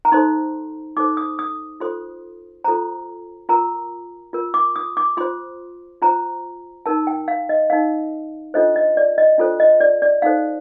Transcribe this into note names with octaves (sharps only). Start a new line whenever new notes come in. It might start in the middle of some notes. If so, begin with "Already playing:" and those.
A#5
D#4 A4 C5 C6
D#4 A4 C5 D6
D#6
D#6
F4 A4 C5 C6
F4 A4 C5 A#5
F4 A#4 A#5
F4 A#4
D6
D#6
D6
F4 C5 C6
F4 C5 A#5
D#4 A#4 A5
G5
F5
D#5
D#4 A#4 F5
D4 F4 A4 C5 D#5
D#5
D5
D#5
D4 F4 A4 C5
D#5
D5
D5
D#4 A4 C5 F5